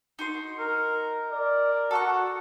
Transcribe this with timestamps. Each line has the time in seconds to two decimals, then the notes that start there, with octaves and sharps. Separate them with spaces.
0.19 D#4 F#4 C6
0.58 A#4
1.31 A#4 D5
1.91 F#4 A4 F#5 C#6